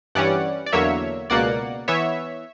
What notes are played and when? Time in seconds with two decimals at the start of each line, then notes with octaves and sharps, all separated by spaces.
0.15 G2 E3 G3 C#4 D5 F#5
0.66 D5
0.72 E2 D3 F#3 A#3 C#5 E5
1.30 C#2 B2 A#3 D5 F#5
1.88 E3 B3 C#5 E5